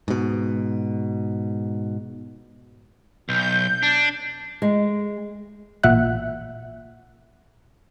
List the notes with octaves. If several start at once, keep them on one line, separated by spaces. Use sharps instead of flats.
G#2 B2
B1 G6
D4
G#3
A1 A#2 E5 F#5 F#6